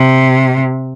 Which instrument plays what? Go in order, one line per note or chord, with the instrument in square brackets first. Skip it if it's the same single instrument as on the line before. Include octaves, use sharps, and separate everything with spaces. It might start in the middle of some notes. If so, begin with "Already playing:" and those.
Already playing: [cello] C3